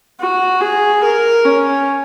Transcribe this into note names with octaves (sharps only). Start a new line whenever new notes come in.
F#4
G#4
A#4
C#4